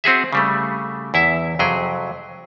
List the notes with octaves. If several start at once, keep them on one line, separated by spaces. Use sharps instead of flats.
C4 F#4 G#4 E5
C#3 G3 A3
E2 E4 E5
F2 C3 F#3 G#4 G5